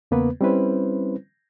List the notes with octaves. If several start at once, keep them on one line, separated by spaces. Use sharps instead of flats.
E2 C#3 A#3 B3 B4
G3 C4 C#4 E4 B4 C5